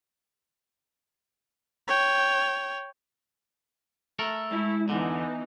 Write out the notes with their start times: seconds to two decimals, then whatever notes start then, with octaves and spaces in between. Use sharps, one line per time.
1.87 C#5 G5
4.19 A3 A4 A#4
4.51 G#3 E4
4.89 E2 D3 E3 B3 D#4 G#5